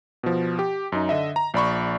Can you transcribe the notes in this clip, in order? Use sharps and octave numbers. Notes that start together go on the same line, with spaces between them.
B2 F3
G4
F#2 D#4
D3 D#5 E5
A#5
A#1 D5 B5 C#6